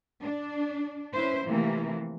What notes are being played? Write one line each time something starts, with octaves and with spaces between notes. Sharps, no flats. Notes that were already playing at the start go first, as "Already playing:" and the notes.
D4
C#4 E4 B4 C5
C3 E3 F3 A3 A#3